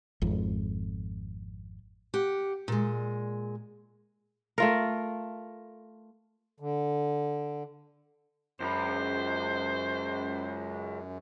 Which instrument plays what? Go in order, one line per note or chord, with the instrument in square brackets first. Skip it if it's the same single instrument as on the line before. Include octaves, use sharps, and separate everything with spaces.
[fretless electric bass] G#1 F2
[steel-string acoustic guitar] G4 F#5
A#2 G#3
[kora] A3 F4 A#4
[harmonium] D3
[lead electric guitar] C#2 B5 [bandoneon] F#2 [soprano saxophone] C5